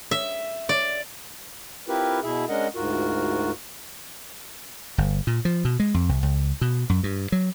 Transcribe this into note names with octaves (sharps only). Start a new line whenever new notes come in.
E5
D5
C4 E4 F4 G4 A#4 B4
B2 E4 G#4 E5
G#3 C#4 D4 A#4 D#5 F#5
D2 G#2 F4 F#4 A#4
G1
A#2
F3
B2
G#3
F2
C2
C#2
B2
F#2
G2
F#3